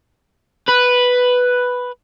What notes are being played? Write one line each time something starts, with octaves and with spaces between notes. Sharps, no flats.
B4